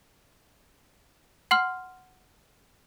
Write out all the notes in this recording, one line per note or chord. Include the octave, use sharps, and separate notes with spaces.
F#5 C6 F6